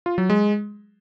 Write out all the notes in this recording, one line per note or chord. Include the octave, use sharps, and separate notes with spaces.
F4
F#3
G#3